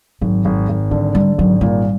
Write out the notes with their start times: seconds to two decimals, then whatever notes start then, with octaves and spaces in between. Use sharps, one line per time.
0.21 G#1 F#3
0.45 G#1
0.69 G#1
0.91 D3 G3
1.15 D3 G3
1.38 G#1 F#3
1.61 A#2 G3